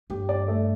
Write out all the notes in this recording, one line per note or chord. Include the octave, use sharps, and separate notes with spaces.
G2 G4
D5
A3